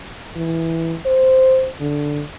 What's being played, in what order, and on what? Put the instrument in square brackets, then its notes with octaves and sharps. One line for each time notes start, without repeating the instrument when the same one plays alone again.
[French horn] E3
C5
D3